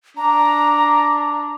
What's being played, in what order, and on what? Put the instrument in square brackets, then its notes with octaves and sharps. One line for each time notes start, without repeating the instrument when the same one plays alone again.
[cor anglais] D4 [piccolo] A#5